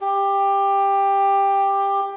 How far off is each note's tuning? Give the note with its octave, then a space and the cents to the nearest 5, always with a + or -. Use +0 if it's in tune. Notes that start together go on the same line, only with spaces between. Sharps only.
G4 +15